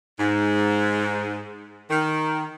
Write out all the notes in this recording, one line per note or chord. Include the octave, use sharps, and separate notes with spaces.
G#2
D#3